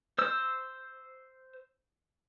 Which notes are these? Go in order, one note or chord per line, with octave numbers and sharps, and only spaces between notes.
C5 E6